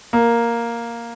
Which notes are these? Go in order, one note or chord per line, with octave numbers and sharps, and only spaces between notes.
A#3